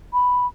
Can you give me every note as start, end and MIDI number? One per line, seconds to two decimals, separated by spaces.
0.13 0.47 83